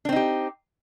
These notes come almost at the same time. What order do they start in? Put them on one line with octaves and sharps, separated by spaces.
D4 C4 D#4 G4